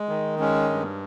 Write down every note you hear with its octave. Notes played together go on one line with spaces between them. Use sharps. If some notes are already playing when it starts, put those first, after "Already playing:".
Already playing: G#3
D#3
G#3 C#4
G2